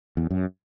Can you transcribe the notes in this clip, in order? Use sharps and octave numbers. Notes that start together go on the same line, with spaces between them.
E2
F#2